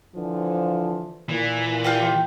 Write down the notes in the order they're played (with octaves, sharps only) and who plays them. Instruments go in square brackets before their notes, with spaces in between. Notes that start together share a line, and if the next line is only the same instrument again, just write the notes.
[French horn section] D3 E3 F3
[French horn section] A#2 [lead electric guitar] E3
[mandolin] F4 G4 G5